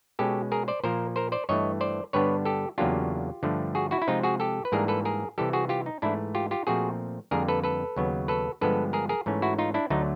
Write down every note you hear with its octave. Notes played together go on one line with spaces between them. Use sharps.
B2 G#3 C#4 G4 A4
G#4 A#4
C5 D5
A#2 F3 A#3 A#4 C5
A#4 C5
C5 D5
G2 E3 A3 C#5 D#5
C5 D5
G2 D3 G3 B3 D4 B4 C#5
G4 A4
E2 C#3 F#3 A#3 D4 F4 G4
G2 D3 F3 A3
F#4 G#4
E4 F#4
E4
C3 F3 G#3 C4 D#4 F4
F#4 G#4
G4 A4
B4
G#2 E3 G3 A#3 D4 G#4 A#4
A4 B4
G#4 A#4
C3 E3 G3 G4 A4
F#4 G#4
F4 G4
D#4
G#2 E3 A3 D4 E4
F4 G4
F4 G4
A#2 F3 A3 C4 F#4 G#4
F2 D3 G3 A#3 G#4 A#4
A4 B4
A4 B4
D#2 C#3 F#3 B3
A4 B4
G2 D3 F3 G#3 B3 A4 B4
G#4 A#4
G#4 A#4
G#2 E3 A3 C#4
E4 F#4
D#4 F4
D4 E4
D2 D3 F#3 A3 D#4